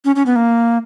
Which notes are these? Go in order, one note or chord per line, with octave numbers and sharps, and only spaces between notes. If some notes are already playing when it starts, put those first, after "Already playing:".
C#4
C#4
B3
A#3